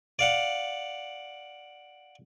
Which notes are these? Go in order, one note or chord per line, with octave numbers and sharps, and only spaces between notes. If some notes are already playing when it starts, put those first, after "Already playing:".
D5 F5 F#5